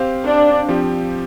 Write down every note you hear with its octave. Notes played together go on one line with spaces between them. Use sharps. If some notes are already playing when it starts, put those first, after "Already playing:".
Already playing: C4 G4 C5 F5
D4
F3 C4 G4